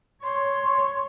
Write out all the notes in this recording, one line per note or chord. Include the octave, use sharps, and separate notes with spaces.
C#5 C6